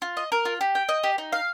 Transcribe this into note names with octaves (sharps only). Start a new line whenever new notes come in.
F4
D#5
A#4
F4
G4
G5
D#5
G4
D#4
F5